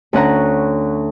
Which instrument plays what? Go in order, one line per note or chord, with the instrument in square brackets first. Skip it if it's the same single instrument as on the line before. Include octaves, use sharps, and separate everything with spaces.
[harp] D2 C#4 F#5 A#5